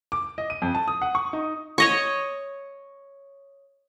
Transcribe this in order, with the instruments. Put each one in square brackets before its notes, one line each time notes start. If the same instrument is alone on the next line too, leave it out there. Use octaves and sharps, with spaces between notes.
[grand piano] D6
D#5
D#7
F2
A5
D#6
F#5
C#6
D#4
[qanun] C#5 D#5 C#6